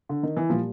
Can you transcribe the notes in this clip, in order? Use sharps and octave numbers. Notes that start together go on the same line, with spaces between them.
D3
D#3
E3
A#2 F3 G3 A#3